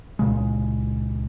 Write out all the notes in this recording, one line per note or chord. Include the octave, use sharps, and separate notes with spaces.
C#2 A#2 C#3 G#3